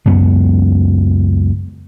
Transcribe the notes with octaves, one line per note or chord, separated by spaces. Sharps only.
C#2 F#2 B3